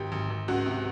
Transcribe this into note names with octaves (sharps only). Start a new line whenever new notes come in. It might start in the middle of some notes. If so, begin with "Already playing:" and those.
Already playing: G#1 G4
G#1
G#1
C#2 F#4
C3